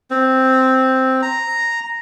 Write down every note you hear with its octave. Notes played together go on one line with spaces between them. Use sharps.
C4
A#5